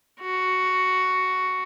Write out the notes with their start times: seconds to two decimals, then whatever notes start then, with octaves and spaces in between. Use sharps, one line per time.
0.21 F#4